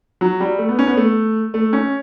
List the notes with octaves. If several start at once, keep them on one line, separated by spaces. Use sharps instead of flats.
F#3
G3
A3
B3
C#4
B3
A3
A3
C#4